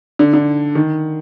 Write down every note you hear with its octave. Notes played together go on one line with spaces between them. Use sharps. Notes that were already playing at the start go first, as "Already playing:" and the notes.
D3
D3
D#3